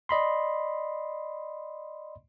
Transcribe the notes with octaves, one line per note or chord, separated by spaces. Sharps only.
D5 D#5 B5 C6